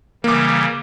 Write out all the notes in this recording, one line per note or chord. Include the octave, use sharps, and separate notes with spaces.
C#3 E3 G3 A#3 D6